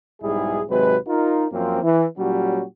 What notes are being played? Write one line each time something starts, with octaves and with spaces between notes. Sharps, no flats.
B1 G#2 G3 E4 G#4
G#1 C3 F#3 G#3 B4
D#4 F4 A#4
F#2 F3 A#3 C4
E3
A#2 F#3 G3 C#4 F#4 G4